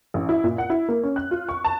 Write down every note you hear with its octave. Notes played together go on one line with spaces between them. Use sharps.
A1
E4
A#2
F#5
E4
A#3
C#4
F#6
F4
C#6
A5